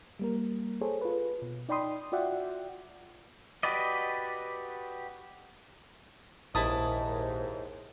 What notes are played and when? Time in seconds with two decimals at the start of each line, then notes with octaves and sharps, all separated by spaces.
0.19 G3 A#3 A#4
0.81 G#4 A4 C5 C#5
1.01 F4 B4
1.42 B2
1.69 D#4 D5 G5 B5 C6 D#6
2.12 F4 F#4 D5 E5 F#5 G5
3.63 F#4 G4 B4 D5 D#5
6.55 A#1 D#2 G#2 E4 A5 D#6